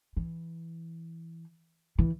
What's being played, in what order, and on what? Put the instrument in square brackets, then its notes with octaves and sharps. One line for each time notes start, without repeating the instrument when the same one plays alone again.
[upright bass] E3
E3